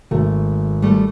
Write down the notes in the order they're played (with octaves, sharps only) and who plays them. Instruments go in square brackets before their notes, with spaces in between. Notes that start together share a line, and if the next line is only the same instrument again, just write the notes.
[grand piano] G#1 [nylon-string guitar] A3
[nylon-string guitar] G3 A3